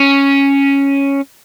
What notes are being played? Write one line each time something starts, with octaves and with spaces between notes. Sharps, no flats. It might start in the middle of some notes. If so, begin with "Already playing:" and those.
Already playing: C#4